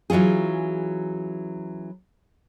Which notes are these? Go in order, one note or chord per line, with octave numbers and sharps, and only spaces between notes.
E3 F#3 C#4 F4 G#4